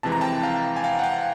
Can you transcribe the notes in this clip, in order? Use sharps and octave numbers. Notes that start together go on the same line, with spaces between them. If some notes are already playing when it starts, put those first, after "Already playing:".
F2 C3 E3 G#3 A5
A#5
G5 A5
F5 G5
G#5
F5 G5
F#5
F5 G5